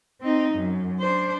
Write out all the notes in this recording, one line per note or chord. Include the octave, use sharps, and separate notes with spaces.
C4 D#4
F#2
D4 C5